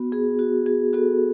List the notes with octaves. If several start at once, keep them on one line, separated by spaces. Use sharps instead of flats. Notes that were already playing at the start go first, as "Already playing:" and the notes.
Already playing: B3 F#4
B3 G#4
F#4
F#4 G#4
B3 F#4 A4